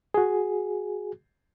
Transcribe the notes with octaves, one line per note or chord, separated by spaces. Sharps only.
F#4 G#4